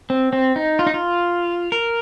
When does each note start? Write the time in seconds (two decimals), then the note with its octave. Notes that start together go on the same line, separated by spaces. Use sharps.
0.10 C4
0.33 C4
0.56 D#4
0.79 F4
0.87 D#4
0.94 F4
1.72 A#4